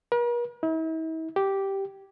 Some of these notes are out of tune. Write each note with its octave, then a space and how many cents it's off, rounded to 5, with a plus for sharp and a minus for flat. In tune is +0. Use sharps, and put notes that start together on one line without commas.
A#4 +45
E4 -45
G4 -5